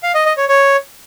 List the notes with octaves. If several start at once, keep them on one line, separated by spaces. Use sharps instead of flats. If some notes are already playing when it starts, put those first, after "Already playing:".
F5
D#5
D#5
C#5
C#5